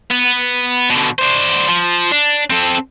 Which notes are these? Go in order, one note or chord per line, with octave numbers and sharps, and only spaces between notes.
B3
B2 D3
D4 C5
F3
D4
C4 A4